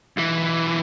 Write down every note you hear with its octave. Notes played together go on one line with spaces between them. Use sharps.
B1 E3